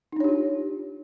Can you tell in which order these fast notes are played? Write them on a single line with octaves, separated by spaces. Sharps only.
D#4 D4 C#5 G4 F4